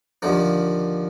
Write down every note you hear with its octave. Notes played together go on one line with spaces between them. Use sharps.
D#2 D3 F3